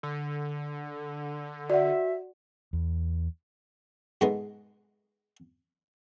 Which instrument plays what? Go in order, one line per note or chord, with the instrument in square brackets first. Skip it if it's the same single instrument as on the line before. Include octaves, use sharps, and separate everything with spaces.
[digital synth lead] D3
[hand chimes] F#4 [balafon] D5 F#5 [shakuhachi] E5
[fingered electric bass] E2
[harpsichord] G#2 B2 G#3 A3 B3 D#4